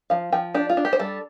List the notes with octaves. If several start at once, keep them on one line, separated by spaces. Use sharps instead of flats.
F3 F5
F3 G5
D4 G4
F4
D4
G4
C5
G3 A4